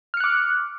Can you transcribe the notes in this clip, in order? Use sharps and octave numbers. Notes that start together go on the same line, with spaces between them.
D6 F6 F#6 C#7